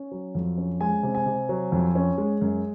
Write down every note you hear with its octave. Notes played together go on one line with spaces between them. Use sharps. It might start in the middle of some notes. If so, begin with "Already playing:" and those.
Already playing: C#4
F#3
F2
C#4
G#3 G#5
C3
G#5
C3
F#3
F2
C#4
G#3
F#2